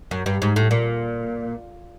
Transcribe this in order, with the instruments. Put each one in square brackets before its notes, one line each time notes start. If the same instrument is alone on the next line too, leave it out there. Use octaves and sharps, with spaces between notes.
[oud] F#2
G2
G#2
A2
A#2